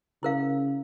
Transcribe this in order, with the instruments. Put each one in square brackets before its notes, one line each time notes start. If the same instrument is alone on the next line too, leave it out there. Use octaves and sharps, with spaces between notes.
[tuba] C#3 [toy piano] E4 A#4 F5